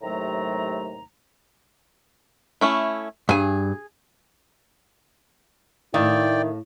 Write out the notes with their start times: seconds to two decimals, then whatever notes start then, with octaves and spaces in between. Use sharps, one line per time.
0.02 D#2 A2 C3 F#3 A3 A#5
2.61 A3 C#4 E4
3.29 G2 G#4 G#5
5.94 A2 D#3 E4 D5 F5 G5